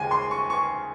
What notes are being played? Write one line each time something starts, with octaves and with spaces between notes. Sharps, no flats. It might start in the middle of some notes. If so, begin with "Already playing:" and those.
Already playing: D#2 C#3 F3 G#3 G5 G#5
C6
C#6
C#6